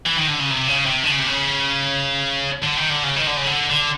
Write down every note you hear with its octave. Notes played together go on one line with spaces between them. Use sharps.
E3
D#3
D3
C#3
C3
C#3
C3
D3
C#3
C3
C#3
D3
D#3
D3
C#3
D#3
D3
C#3
D3
D3